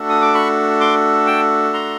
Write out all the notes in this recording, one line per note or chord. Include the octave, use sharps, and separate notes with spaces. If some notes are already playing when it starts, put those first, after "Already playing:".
Already playing: A3 D4 F#4 A4
D#6
D6
B5 C#6
C6 D6
G5 A5
A#5 C6